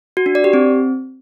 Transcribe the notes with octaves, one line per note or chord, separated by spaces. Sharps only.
F#4
D4
D5
G4
C4